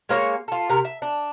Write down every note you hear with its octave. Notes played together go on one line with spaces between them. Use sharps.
G#3 A#3 C5 C#5
F4 A4
C3 A#4
E5
D4